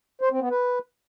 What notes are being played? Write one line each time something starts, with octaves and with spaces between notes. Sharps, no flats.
C5
C4
B3
B4